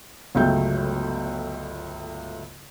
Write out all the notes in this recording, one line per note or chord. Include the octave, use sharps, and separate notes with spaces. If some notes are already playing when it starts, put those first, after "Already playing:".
G1 C#2 F#3 A3 G5 G6